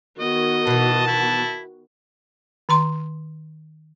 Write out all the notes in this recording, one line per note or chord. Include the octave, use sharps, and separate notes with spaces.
D#3 B3 F#4 D#5
B2 E3 A5
E4
D#3 A#5 C6